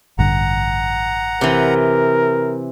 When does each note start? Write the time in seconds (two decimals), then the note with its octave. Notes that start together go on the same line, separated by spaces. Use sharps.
0.19 A1 G2 D3 F#5 A#5
1.41 C3 E3 A#4